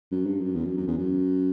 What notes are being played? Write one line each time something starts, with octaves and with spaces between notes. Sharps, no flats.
F#2
G2
F#2
E2
F#2
F#2
E2
F#2